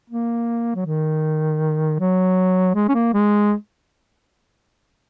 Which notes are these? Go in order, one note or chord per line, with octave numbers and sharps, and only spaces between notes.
A#3
F#3
D#3
F#3
G#3
C#4
A#3
G#3